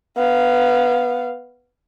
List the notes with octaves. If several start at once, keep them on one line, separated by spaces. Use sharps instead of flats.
B3 F5